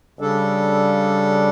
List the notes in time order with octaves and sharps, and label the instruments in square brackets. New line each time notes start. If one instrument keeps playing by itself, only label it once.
[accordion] C#3 G3 D4 A4